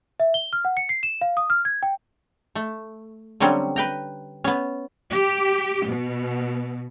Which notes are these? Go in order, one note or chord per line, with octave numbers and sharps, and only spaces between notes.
E5
G7
F6
F#5
C#7
C7
E7
F5
D#6
F6
G#6
G5
A3
D3 F#3 G3 C4 C#4
B4 G5 A#5
B3 C#4
G4
B2